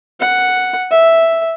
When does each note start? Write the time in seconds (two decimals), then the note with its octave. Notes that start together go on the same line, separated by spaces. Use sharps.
0.20 F#5
0.91 E5